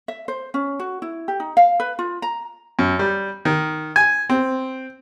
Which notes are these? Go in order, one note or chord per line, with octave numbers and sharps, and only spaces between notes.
E5
C5
C#4
F#4
E4
G4
D#4
F5
B4
F4
A#5
F#2
G3
D#3
G#5
C4